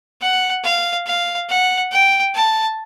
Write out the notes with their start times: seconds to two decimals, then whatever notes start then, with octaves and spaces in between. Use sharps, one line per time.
0.22 F#5
0.64 F5
1.07 F5
1.50 F#5
1.92 G5
2.35 A5